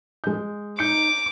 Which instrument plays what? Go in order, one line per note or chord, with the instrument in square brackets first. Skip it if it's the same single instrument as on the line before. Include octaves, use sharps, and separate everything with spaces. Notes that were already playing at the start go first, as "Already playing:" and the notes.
[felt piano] G#3 G6
[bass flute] D#4 [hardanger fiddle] D6 [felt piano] G6 C#7